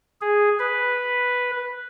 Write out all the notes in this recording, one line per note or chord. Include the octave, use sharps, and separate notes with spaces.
G#4
B4